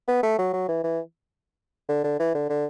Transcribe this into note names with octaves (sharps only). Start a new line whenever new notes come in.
B3
A3
F#3
F#3
E3
E3
D3
D3
E3
D3
D3